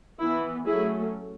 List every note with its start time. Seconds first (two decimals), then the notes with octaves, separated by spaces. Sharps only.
0.20 E3 B3 E4
0.66 F#3 A3 C#4 E4 G#4